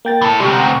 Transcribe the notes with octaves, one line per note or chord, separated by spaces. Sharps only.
A#3 G5 A6
E3 A4
D2 C3 G3
F#5 G5 A#5